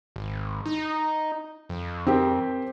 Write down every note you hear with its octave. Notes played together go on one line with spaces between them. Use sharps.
G#1
D#4
F2
C4 G4 A#4